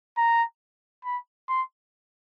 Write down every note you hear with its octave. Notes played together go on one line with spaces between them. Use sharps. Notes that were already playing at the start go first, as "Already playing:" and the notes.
A#5
B5
C6